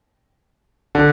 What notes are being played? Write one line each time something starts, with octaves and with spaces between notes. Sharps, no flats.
D3